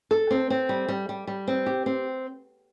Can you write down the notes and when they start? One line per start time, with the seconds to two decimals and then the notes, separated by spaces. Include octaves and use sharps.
0.11 A4
0.31 C4
0.50 C4
0.69 G3
0.88 G3
1.09 G3
1.27 G3
1.48 C4
1.66 G4
1.86 C4